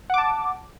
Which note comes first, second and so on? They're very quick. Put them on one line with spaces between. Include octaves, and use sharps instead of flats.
F#5 D6 A5